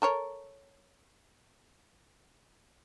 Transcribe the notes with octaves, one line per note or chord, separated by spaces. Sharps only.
A4 A#4 C#5